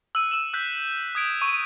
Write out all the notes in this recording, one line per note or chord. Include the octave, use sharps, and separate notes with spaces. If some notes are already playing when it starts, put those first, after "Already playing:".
E6 F#6 D#7 F#7
E6 D#7 E7
E6 F#6 G6 B6
D#6 G#6 D7
C#6 D#7